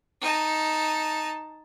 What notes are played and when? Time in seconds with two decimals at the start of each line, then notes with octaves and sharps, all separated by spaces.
0.21 D#4 A5